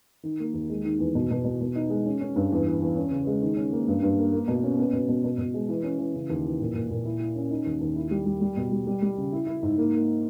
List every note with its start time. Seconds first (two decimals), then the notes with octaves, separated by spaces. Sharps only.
0.23 D#3
0.40 A#3
0.54 D#2
0.70 G#3
0.84 D#3
0.99 E2
1.15 B2
1.31 B2
1.44 B2
1.61 B2
1.76 D#4
1.90 G#3
2.06 C#4
2.21 C#4
2.36 G2
2.51 E2
2.67 E2
2.82 E2
2.96 C#4
3.11 C#3
3.27 G#3
3.42 D#3
3.56 C#4
3.72 A#3
3.88 G2
4.03 G2
4.18 A#3
4.33 A#3
4.48 B2
4.63 C#4
4.78 B3
4.93 B2
5.08 B2
5.24 B2
5.38 B2
5.54 G#3
5.69 E3
5.83 C#4
5.98 E3
6.14 C#3
6.30 D#2
6.45 E3
6.60 A#2
6.74 A#2
6.90 A#2
7.05 E4
7.20 E4
7.36 C#4
7.50 D#4
7.66 D#2
7.81 D#2
7.96 E4
8.11 G3
8.26 G3
8.41 G3
8.56 B2
8.72 G3
8.87 G3
9.02 G3
9.18 C#3
9.33 E4
9.47 E4
9.63 G#2
9.78 A#3
9.93 A#3